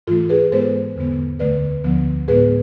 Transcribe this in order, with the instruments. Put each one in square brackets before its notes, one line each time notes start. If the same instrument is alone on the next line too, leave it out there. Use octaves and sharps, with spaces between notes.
[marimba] G#2 E3 A3 F4 A4
G#4 B4
G#2 G#3 B3 A4 C5
E2 D3 G#3 B3
D2 D3 A3 B4 D5
D2 D3 F3 B3
A2 G#3 B3 G#4 B4